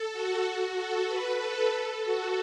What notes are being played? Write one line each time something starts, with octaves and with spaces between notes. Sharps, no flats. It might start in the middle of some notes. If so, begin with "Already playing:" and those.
Already playing: A4
F#4
A4
B4
A4
A4
F#4